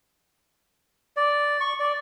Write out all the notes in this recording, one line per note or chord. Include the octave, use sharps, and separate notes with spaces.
D5
C#6
D5